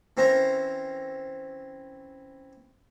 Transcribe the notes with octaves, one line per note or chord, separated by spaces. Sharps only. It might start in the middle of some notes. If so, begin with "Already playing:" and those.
E3 C4 C#4 A#4 C5 A#5